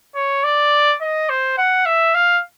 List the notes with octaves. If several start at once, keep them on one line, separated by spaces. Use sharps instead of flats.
C#5
D5
D#5
C5
F#5
E5
F5